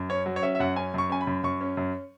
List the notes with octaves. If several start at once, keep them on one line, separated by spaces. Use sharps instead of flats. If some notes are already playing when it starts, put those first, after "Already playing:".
Already playing: F#2
C#4 C#5
F#3
C#5
C#4 E5
E5
F#2 F#5
C#4 G#5
F#2 C#6
C#4 G#5
B5
F#2
F#2 C#6
C#4
F#2